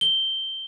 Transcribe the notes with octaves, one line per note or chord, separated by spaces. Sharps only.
G7